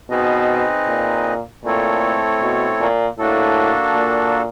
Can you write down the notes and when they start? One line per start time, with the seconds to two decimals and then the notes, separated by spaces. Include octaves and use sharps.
0.10 B2 C4 D#4 G#4 B4 D#5
0.87 A#2
1.64 A#2 A3 C4 E4 A4 C#5
2.41 B2
2.80 A#2
3.19 A2 A#3 D4 F#4 A4
3.95 A#2